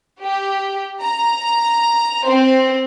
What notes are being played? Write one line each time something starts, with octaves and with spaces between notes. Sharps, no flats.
G4
A#5
C4